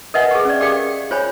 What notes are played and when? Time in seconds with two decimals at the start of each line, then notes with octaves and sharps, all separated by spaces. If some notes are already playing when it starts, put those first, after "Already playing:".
0.14 A#4 B4 D#5 E5 F#5 G#5
0.31 G#4 C#6
0.45 C#4 D5
0.60 G4 G#4 A#4 D5 F5 G5
1.11 F4 C5 C#5 G#5 B5